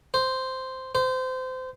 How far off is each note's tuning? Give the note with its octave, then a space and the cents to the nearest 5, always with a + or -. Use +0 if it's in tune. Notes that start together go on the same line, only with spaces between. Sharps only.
C5 -5
C5 -25